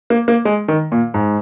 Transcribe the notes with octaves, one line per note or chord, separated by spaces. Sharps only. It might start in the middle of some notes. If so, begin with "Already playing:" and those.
A#3
A#3
G#3
D#3
A#2
G#2